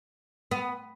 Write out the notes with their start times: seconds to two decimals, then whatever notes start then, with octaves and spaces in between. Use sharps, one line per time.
0.51 B3